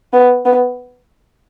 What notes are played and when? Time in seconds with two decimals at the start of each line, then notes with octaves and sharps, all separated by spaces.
0.13 B3
0.45 B3